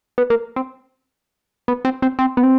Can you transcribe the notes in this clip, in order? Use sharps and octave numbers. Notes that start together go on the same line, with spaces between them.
B3
A#3
C4
B3
C4
C4
C4
B3
C4